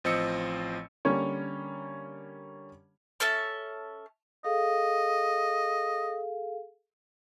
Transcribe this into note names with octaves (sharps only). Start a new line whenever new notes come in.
A1 F3 C4 D#5 E6 C#7
D3 G3 A#3 C#4 C#5
C#4 A4 E5 A5
G#4 A4 D#5 F5